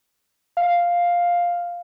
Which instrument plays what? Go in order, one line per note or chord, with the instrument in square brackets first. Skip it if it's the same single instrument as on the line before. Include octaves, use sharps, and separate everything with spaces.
[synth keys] F5